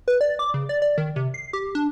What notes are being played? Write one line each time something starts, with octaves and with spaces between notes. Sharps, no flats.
B4
D5
D6
C#3
D5
D5
D#3
C3
C7
G4
D4